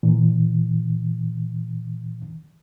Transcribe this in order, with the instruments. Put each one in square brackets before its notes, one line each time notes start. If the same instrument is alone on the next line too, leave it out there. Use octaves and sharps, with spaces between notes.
[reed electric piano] A#2 E3